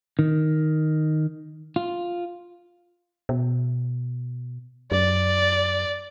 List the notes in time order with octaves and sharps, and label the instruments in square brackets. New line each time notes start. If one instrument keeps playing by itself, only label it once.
[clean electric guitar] D#3
F4
[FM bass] B2
[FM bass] F#2 [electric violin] D5